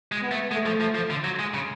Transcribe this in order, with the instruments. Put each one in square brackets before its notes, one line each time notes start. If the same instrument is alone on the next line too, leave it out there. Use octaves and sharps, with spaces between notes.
[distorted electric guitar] G#3
[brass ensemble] B3
[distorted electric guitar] A3
[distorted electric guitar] G#3 [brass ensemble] A3
[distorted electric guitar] F3
F3
F3
D3
F#3
G#3
C#3